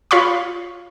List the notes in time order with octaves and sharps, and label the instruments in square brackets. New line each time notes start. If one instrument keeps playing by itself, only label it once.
[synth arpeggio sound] F4 C#5 F5 B5 C#6